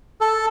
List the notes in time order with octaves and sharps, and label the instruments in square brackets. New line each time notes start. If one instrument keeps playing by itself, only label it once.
[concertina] A4